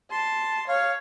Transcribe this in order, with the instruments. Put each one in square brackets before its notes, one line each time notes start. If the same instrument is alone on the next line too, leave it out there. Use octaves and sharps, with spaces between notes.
[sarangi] A5 [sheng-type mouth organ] C6
[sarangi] C#5 [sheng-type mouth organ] F5